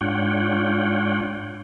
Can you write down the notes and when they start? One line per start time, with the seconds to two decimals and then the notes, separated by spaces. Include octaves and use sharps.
0.01 G#2 D4 F4 C#5 F#5 G5